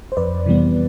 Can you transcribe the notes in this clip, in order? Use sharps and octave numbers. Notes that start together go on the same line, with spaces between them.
C5
F2 B4 D5
C3 E3 G3 B3